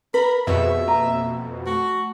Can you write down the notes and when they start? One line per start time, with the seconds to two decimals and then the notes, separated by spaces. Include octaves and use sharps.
0.14 A#4 B4 B5
0.47 F2 B2 B3 G#4 B4 C#5 E5
0.88 A#3 A#5
1.66 A3 F#4